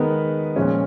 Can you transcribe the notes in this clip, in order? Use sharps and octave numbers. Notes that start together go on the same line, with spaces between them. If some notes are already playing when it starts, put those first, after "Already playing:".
Already playing: D#3 G#3 B3 A#4 B4
A#2 F3 G#3 C#4